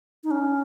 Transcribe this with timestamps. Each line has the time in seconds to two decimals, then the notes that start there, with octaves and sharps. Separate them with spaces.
0.24 D#4
0.31 C#4